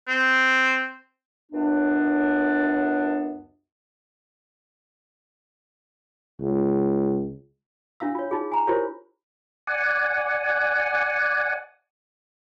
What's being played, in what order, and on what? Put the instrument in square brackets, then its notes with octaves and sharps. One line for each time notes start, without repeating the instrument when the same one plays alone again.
[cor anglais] C4
[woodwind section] C#2 F#2 B3 D4
[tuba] C#2
[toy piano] D4 E4 F5 E6
F4 C#5
D#4 F4 G#4
G#5 A#5
E4 F4 G4 A#4 C5 C#5
[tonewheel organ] D5 F#5 G#5